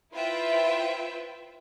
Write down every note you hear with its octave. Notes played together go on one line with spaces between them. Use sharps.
E4 F4 B4 C5 E5 G5